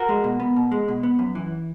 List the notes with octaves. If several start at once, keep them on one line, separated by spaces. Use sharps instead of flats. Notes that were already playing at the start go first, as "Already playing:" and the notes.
Already playing: F#4 A#4
G#3
B2
B3
B2
G#3
B2
B3
F#2
E3